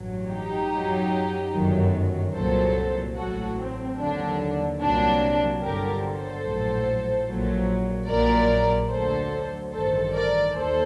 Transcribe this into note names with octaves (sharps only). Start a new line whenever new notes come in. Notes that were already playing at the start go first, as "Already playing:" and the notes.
Already playing: A1 G2 F#3
D#4 G4
F#2 F#3
G1 F#2 D#3 F#3
C2 A#2 F#3 A4 C5
A1 A2 F#3 F#4 A4
C4
D#2 D3 F#3 D4
C2 A#2 F#3 D4
G1 G2 D3 F#3 G4 A#4
A4 C5
A#1 A2 F#3
A#1 A#2 F#3
A#1 A#2 F#3 A#4 D5
D2 D3 F#3 A4 C5
A1 G2 D#3 A4 C5
A#4 D5
D#2 A4 C5